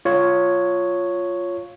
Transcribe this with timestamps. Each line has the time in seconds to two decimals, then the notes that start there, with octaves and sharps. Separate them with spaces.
0.05 F4 C#5